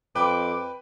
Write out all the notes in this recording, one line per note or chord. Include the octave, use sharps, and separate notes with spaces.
F2 B4 G5 D6